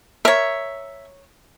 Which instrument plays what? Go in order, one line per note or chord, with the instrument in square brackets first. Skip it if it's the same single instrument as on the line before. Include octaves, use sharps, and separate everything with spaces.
[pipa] A#4 C#5 [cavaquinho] E5